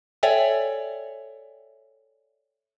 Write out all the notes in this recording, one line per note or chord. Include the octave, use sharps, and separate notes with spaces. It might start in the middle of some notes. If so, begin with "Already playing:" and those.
A4 C#5 D5 E5 G5 G#5